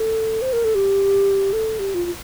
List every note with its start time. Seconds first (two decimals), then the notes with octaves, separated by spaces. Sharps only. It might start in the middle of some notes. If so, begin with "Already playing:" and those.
Already playing: A4
0.42 C5
0.53 A#4
0.64 A4
0.75 G4
1.53 A4
1.79 G4
1.94 F4
2.05 F4